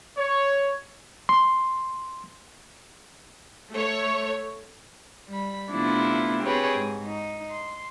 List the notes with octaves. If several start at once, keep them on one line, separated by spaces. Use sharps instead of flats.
C#5
C6
A3 C#5
G3 B5
C3 F3 A3 B3 D4 E4
C4 G4 G#4 B4 C#5
G#2
D#4
C6